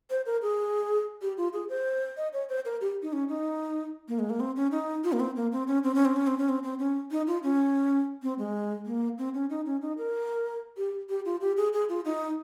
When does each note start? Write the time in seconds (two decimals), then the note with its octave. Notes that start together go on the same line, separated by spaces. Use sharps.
0.10 C5
0.26 A#4
0.42 G#4
1.22 G4
1.37 F4
1.53 G#4
1.69 C5
2.17 D#5
2.33 C#5
2.49 C5
2.65 A#4
2.81 G4
3.02 D#4
3.13 C#4
3.29 D#4
4.08 A#3
4.19 G#3
4.30 A#3
4.40 C4
4.56 C#4
4.71 D#4
5.04 F4
5.12 A#3
5.20 C4
5.36 A#3
5.52 C4
5.68 C#4
5.84 C4
5.95 C#4
6.05 C4
6.16 C#4
6.27 C4
6.38 C#4
6.49 C4
6.63 C4
6.79 C#4
7.11 D#4
7.27 F4
7.43 C#4
8.23 C4
8.39 G#3
8.86 A#3
9.18 C4
9.34 C#4
9.50 D#4
9.66 C#4
9.82 D#4
9.98 A#4
10.77 G4
11.09 G4
11.25 F4
11.41 G4
11.57 G#4
11.73 G#4
11.89 F4
12.05 D#4